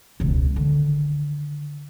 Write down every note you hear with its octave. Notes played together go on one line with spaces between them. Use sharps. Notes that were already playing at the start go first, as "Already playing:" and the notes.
E1 C#2
D3 D#3